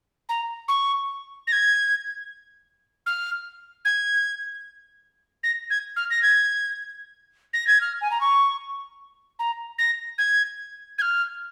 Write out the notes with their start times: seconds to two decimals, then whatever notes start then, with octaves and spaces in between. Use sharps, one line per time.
0.29 A#5
0.68 C#6
1.47 A#6
1.52 G#6
3.06 F6
3.85 G#6
5.43 A#6
5.70 G#6
5.96 F6
6.11 A#6
6.22 G#6
7.53 A#6
7.67 G#6
7.81 F6
8.01 G#5
8.11 A#5
8.21 C#6
9.39 A#5
9.78 A#6
10.18 G#6
10.98 G#6
11.02 F6